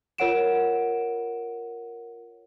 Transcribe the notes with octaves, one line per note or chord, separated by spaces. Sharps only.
F4 A#4 C#5 F#5 D7 E7